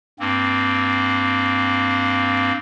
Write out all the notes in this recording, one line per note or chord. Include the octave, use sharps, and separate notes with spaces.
G2 A#3 C4